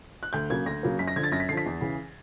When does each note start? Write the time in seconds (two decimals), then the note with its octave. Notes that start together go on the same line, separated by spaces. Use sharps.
0.23 F#6
0.33 D2 G6
0.50 C#3 F#3 A#3 G#6
0.66 D2 A#6
0.83 C#3 F#3 A#3
0.99 F#2 B6
1.08 A#6
1.16 D3 F3 G#6
1.23 A6
1.32 F#2 A#6
1.40 B6
1.49 D3 C7
1.52 F3 B6
1.66 E2
1.81 C#3 E3